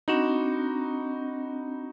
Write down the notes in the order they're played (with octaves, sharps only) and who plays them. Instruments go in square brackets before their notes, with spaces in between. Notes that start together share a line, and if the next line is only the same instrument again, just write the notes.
[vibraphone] C4 D4 B5 [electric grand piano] D#4 F#4